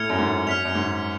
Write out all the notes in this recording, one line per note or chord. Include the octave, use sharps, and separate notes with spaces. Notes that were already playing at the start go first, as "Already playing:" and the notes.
Already playing: A2 F6 G#6 C#7 F7
F#2
G#2
F#2 F6 B6 F7
F#2
G#2